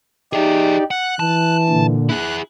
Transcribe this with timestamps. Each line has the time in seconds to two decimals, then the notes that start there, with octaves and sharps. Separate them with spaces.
0.33 D#4 G4 G#4 D5 E5
0.91 F#5 F#6
1.20 E3 A5
1.69 A#2 D3
2.09 E4 G#4 F#6